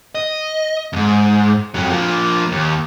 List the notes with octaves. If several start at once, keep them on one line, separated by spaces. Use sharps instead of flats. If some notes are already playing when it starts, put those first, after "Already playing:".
D#5
F2 G#2
F2 F#3
F3 A#3
D#2